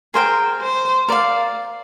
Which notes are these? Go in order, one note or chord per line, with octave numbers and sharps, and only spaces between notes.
G#4 A#4 C5 G5
C5
A#4 D5 F5